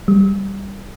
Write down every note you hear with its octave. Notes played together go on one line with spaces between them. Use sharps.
G3